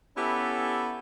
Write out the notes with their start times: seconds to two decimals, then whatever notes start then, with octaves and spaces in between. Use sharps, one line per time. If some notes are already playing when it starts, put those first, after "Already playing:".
0.16 B3 C#4 E4 G4 A4